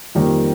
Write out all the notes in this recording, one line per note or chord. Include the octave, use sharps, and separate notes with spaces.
F2 D#3 G3 A#3